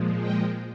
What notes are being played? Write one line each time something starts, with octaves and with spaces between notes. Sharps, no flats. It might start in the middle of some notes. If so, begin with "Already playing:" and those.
Already playing: A#2 F3 G#3
D#5 G5